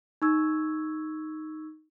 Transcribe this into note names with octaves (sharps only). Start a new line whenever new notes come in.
D#4 C#6 E6 G#6